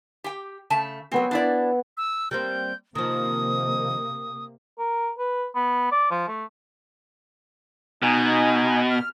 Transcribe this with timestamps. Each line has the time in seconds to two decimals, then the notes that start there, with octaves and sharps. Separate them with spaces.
0.24 G4 G5
0.70 C#3 A3 A5
1.12 F#3 B3 C4 G#5
1.31 D4 E4 D5
1.97 E6
2.31 G3 A#3 C4 G6
2.95 C3 D#3 F3 A#3 D#6
4.79 A#4
5.19 B4
5.55 B3
5.92 D5
6.11 F3
6.28 A3
8.03 B2 D#4 G#5
8.90 F6